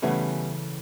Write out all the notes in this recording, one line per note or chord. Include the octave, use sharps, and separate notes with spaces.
C#3 E3 G3 A3 B3 C#4